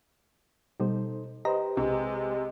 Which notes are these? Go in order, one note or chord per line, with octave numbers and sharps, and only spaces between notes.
B2 G3 D#4 A4 C5
G4 B4 C5 D#5 A#5
B1 C3 G#3